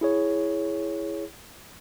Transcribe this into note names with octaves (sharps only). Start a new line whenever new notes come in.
E4 G#4 C#5